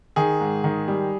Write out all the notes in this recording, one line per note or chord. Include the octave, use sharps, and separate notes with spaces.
D#3 G#4
G#2
D#3
G3